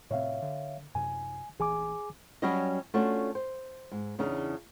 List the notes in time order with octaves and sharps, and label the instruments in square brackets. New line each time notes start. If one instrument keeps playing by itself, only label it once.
[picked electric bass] A2 C3 C4 [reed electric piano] C#5 E5 F5
[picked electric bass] D3
[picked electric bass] F#2 C3 [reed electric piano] G#5
[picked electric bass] A#1 E3 [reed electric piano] G#4 G#5 D6
[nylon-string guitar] F#3 G3 C#4 F#4 G4 D#5
A3 C#4 D4 F4 F#4
C5
G#2
E2 C#3 D4 D#4